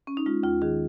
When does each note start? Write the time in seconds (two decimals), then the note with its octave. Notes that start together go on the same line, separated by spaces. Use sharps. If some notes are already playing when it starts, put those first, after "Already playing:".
0.07 C#4
0.17 D#4
0.26 G#3 F4
0.43 D#2 F4
0.62 D#3 G#4